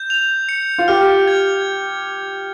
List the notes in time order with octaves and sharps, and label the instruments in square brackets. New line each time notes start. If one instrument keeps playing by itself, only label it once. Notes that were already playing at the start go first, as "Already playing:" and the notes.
Already playing: [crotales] G6
F7
C#7
[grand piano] F4
[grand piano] G4 [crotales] F6
[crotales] G#6